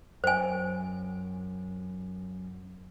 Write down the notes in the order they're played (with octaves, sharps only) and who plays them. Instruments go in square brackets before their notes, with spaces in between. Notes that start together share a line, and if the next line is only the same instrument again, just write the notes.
[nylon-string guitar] F#2 [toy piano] C5 G#5